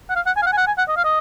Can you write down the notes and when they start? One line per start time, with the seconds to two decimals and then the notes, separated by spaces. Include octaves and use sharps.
0.10 F#5
0.16 F5
0.26 F#5
0.36 G#5
0.42 F5
0.46 F#5
0.52 G#5
0.57 F#5
0.67 G#5
0.78 F#5
0.88 D#5
0.96 F5
1.04 D#5